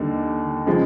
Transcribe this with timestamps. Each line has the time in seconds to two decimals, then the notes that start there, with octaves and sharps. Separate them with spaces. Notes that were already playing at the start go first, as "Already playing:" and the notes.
Already playing: D#2 D3 G3 A#3 D#4
0.66 C#3 F3 G#3